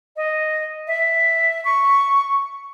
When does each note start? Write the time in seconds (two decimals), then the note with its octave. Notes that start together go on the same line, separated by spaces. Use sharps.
0.16 D#5
0.87 E5
1.64 C#6